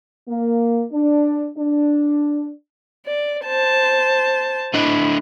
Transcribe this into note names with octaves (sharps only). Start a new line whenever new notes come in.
A#3
D4
D4
D5
C5 A5
A3 D4 E4 D#5